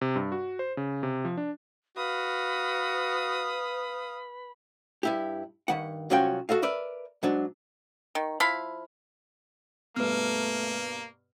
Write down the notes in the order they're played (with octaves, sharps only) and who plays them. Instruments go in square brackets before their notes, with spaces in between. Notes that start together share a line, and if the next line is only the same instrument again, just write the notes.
[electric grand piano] C3
G2
F#4
C5
C#3
C3
F3
D4
[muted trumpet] F#4 [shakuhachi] B4 [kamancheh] F5 D#6 [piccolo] B5
[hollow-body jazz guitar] G2 E4 G4
G2 D#3 F#5
C2 F#3 C#4 F4 F#4 G5
F#4 A4 D#5 F5
A#4 B4 D5 E5
G#2 F#3 D4
[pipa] D#3
F3 E4 F5 B5
[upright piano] G2 B2 [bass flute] A3 [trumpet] A#3 [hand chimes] B4 F6